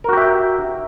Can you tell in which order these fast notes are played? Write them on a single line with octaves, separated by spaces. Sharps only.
A#4 F#4 G4 E5 G5